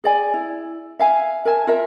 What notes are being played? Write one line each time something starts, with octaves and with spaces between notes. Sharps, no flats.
G#4 D5 G#5
E4
E5 F5 G#5
A#4 E5 G#5 A5
F4 A#4 E5